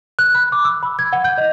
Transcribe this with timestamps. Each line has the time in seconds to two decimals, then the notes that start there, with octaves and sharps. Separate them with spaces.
0.19 F#6
0.35 B5
0.52 D6
0.65 E6
0.83 B5
0.99 G#6
1.13 F#5
1.24 G6
1.38 D#5